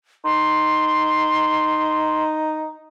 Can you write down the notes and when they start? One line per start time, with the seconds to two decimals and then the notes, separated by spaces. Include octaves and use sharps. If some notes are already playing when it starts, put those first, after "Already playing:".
0.25 D#4 C6